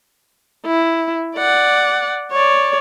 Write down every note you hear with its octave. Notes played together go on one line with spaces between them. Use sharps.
E4
D5 F#5
C#5 D5